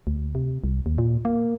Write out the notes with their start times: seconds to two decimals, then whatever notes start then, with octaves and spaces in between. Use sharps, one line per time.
0.07 D2
0.35 C3
0.64 C2
0.86 D#2
0.98 A#2
1.25 A#3